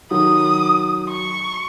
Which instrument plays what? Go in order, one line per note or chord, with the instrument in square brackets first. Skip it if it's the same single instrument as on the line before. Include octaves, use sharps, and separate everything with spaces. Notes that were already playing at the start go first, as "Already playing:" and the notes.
[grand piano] D#3 F#3 [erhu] D#6
[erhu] C#6